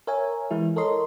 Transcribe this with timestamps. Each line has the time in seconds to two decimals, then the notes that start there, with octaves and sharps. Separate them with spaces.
0.07 A#4 C#5 E5 G#5
0.51 E3 G#3 E4
0.76 A4 A#4 C#5 D#5 C6